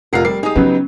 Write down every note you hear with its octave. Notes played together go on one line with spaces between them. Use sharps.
F1 F4 A#4 F#5 C7
G3 A#4 D5 C7
D#4 G4 G#4 D#6
C#3 F#3 B3 C#4